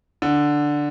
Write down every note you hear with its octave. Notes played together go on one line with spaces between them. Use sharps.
D3